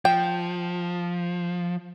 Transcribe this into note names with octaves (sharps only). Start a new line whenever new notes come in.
F3 G5